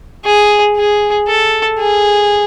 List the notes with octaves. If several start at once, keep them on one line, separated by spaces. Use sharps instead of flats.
G#4
G#4
A4
G#4